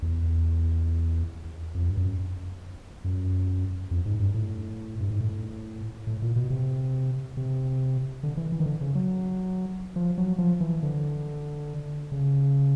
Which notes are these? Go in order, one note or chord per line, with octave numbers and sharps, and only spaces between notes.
E2
F2
G2
F#2
F#2
F2
G#2
G2
A2
G2
G#2
A2
A2
A#2
B2
C3
C3
D3
E3
E3
D#3
D3
C#3
F#3
F3
F#3
F3
E3
D3
C#3